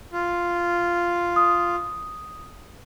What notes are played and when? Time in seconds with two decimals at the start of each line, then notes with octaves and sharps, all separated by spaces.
0.13 F4
1.36 D#6